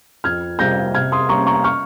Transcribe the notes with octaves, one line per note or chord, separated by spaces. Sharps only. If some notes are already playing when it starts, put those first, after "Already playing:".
F2 F6 G#6
C3 G3 C4 G6 A#6
C3 F6 G#6
C6 D#6
G3 A#3 C#4 A#5 C#6
A#5 C#6
C#6 F6